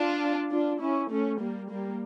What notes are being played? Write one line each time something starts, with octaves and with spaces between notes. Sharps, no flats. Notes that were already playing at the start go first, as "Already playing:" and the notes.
Already playing: D4 F4
D4 F4
C#4 E4
A3 C#4
G3 A#3
G3 A#3